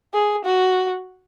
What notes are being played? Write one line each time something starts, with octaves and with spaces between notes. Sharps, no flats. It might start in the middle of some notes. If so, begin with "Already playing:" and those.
G#4
F#4